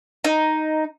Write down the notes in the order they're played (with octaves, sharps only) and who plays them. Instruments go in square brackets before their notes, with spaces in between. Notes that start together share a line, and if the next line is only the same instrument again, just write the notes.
[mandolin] D#4